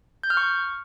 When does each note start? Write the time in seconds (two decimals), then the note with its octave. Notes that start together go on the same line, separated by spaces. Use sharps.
0.23 G6
0.30 F6
0.37 C#6